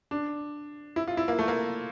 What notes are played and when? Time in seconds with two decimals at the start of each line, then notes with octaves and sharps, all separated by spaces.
0.11 D4
0.96 E4
1.08 F4
1.17 E4
1.28 A#3
1.39 A3
1.48 A#3